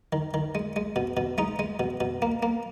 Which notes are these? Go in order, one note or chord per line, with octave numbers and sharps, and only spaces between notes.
D#3
D#3
G#3
G#3
B2
B2
G#3 D#4
G#3
B2
B2
A#3
A#3